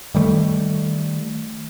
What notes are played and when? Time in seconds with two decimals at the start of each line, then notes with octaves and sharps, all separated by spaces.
0.15 D#3 G3 A3